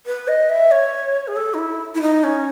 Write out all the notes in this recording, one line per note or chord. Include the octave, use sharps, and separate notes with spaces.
B4
D#5
E5
C#5
G#4
A4
D#4
E4
E4
D#4
C#4